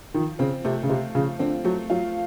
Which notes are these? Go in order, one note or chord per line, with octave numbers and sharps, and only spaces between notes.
D#3 F3
C#3 C4
C3 A3
C#3
C3 F4
C#3 F3
D3 C4
F#3 A3
F#3 F4